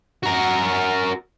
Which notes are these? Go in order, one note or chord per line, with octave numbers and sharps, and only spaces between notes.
F#4 A#4